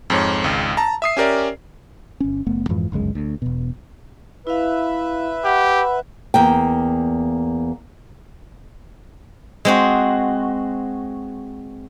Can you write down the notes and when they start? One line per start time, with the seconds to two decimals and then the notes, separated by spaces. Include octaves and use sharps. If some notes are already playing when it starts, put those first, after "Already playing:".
0.10 F2 G#2 C#5
0.44 G#1 C#2
0.77 A5 A#5
1.02 E5 D#6 C7
1.17 C#4 G4 A#4 D5 E5
2.20 G1 C#4
2.47 F#1 A3 B3
2.69 F2 G#2 E3 F3
2.92 G1 C#2 F#2 G#3
3.15 D2
3.42 E1 B2
4.47 E4 B4 E5 F5
5.45 G4 F#5 B5
6.34 E2 A#3 G5
9.65 G#3 C4 F#4